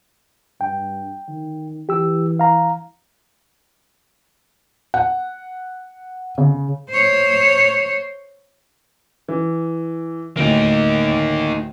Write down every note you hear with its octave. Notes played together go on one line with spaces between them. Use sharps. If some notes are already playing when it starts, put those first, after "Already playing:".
G2 G5
D#3
E3 G4 E6
F5 A#5
F#5
C#3
C5 C#5
E3
D2 A2 A#3 D#4